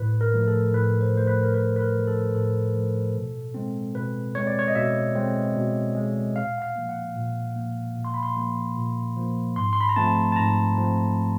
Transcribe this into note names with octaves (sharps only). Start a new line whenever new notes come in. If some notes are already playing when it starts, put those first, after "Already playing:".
Already playing: A2 B4
A#4
F3 A3
A4
A2 B4
C5
F3 A3 C5
B4
A#4
A2 B4
B4
A#4
F3 A3
A4
A2 A4
F3 A3
B2
G#3 C4
B2 B4
G#3 C4 C#5
D5
C#5
D#5
B2 E5
G#3 C4
B2
G#3 C4
A#2 F5
F#5
F5
F3 A#3
F#5
A#2
F3 A#3
A#2
C6
B5
C6
F3 A#3
A#2
F3 A#3
G#2 C6
C6
B5
A#5
F3 A3 C4 A5
A5
G#2 A#5
F3 A3 C4